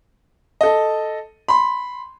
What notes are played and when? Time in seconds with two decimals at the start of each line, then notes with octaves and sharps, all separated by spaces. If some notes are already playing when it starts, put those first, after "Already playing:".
0.61 A4 D#5
1.48 B5 C6